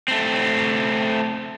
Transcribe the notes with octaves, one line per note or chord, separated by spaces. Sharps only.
A3 C4